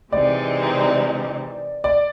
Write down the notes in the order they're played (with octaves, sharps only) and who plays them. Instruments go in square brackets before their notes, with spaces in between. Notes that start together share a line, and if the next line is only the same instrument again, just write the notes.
[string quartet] C3 E3 G#3 C4 D#4 [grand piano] D5
[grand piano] D5